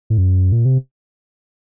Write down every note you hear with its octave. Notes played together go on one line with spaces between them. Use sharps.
A2
F#2
A#2
C3